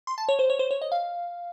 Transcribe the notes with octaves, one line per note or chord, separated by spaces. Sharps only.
C6
A5
C#5
C5
C#5
C5
C#5
D#5
F5